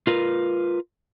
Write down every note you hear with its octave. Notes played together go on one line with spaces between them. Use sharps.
F4 A#4 B4